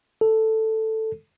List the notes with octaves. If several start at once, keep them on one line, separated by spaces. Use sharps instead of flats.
A4